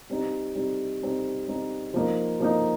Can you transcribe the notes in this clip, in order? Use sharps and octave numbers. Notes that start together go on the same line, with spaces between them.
G3 C4 D#4
G3 C4 D#4
G3 C4 D#4
G3 C4 D#4
F3 A#3 D#4
F3 A#3 D#4